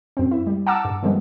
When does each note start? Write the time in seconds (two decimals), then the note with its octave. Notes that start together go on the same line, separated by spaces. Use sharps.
0.17 F#2 C4
0.31 E4
0.47 G3
0.67 F#5 A5 A#5 D6 E6
0.85 G2
1.03 D#3 F3 G3 G#3 B3